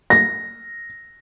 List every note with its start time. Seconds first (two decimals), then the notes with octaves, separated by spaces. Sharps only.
0.10 A#6